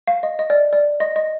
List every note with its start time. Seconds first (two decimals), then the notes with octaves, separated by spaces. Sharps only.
0.07 F5
0.23 D#5
0.39 D#5
0.50 D5
0.73 D5
1.00 D#5
1.16 D#5